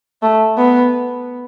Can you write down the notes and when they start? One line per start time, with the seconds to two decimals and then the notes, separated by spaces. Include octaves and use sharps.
0.22 A3
0.58 B3